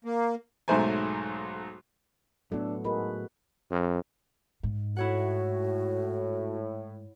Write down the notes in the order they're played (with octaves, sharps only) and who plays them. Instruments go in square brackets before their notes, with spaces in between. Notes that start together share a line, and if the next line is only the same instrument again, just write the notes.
[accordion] A#3
[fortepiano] B1 G#2 F#3 A3 C5 G#5
[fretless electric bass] A2 F#3 A3 [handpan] B3 A4 [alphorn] D4
[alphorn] G#2 [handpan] F#4 G#4 B4 [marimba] A#4 D#5 B5
[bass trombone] F2
[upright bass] G#2
[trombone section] A2 [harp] E4 C#5 F#5 [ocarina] F#4